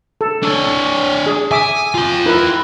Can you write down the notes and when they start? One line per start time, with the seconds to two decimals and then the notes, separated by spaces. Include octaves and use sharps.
0.21 A4
0.43 D4 C#5
1.26 G#4
1.51 E5 G#5 D6 D#6
1.94 F4 G5
2.26 E4 A#4 B4